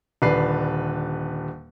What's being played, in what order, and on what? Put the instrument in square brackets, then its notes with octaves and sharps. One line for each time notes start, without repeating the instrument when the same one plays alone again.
[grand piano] D#1 D3 B4 D5 C7